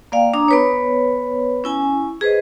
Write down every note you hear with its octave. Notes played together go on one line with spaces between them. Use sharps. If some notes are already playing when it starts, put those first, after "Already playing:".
A#3 D5 F5 G5
D4 A#5 D#6
B3 B4 C#5
C#4 E4 G#5
G#4 B4 C5 D#5